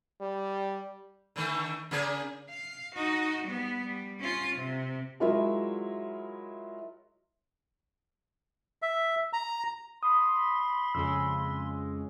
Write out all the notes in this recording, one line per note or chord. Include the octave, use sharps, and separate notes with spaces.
G3
D3 D#3 A3
C#3 A#3 G#4
F5
D#4 F#4
G3 B3
G3
C#4 F4
C3
F#3 G#3 E4 F4 A#4 E5
E5
A#5
B5 C6 D#6
F2 C#3 G#3 E6